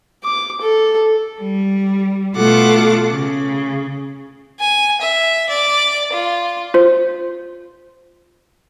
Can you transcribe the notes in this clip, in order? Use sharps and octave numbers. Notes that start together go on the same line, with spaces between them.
D6
A4
G3
B2 A3 F4 A4 F#5 D6
C#3
G#5
E5
D5
F4
F4 C5